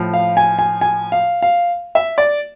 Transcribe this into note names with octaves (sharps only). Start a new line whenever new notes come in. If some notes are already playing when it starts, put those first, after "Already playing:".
Already playing: A2 F3
F5
G#5
G#5
G#5
F5
F5
E5
D5